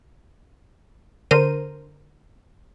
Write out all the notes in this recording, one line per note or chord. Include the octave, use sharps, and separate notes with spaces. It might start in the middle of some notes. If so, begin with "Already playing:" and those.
D3 A#4 C5 D#7